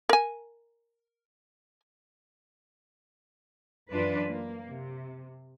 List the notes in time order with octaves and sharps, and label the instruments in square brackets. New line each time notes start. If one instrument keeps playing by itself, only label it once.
[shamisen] A#4 G#5
[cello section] F#2 E3 D4 F4 B4
A#3
C3